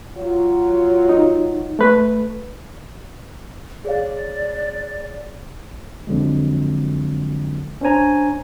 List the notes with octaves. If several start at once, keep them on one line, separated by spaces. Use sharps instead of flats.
F#3 F4
D#4
A3 B4
G#4 C#5 D5 F5
F2 D3 F#3 G#3
C#4 D4 C5 C#5 G#5 A#5